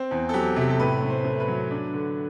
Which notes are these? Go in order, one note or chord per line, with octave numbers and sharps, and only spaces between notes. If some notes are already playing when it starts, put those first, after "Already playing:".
Already playing: C4
E2
A4
F#3 G4
C3 G4
A4
A2 B4
A2
C5
A3
B4
F#3
D4
D3